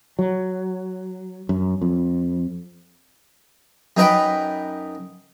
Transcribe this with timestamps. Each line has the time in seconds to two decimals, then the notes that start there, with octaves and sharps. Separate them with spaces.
0.19 F#3
1.49 F#2
1.82 F2
3.97 F#2 D#4 B4 G5